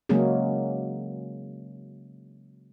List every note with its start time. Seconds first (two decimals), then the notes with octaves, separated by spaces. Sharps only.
0.09 C#3 F#3 G#3 A#3 C#4 G#4